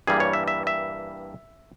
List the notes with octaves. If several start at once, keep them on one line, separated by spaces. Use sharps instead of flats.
G2 E3 G3 A#3 G#4
C#5
E5
E5
E5